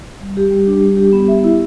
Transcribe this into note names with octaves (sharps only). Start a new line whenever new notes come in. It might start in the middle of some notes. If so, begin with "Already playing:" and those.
G3
G4
G3
D4
G3
G4
B3
E5
E4